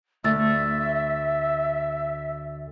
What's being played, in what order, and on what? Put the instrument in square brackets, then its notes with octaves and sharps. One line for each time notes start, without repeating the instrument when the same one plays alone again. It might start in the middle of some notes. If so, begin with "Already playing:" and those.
[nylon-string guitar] D2 [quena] E5 [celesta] E6 A6